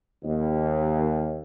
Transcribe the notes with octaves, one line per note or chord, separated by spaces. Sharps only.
D#2